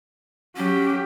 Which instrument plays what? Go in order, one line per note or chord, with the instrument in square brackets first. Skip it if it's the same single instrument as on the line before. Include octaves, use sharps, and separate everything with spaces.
[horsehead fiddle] F#3 G4 [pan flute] C#4